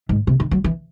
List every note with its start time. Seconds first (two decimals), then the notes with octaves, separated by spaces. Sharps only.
0.09 G#2
0.27 C3
0.40 D#3
0.51 F#3
0.64 E3